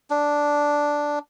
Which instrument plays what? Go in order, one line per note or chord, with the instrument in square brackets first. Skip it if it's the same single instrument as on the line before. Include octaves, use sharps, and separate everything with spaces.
[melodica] D4